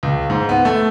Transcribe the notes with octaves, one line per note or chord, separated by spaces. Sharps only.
C#2
G#2
B3
A3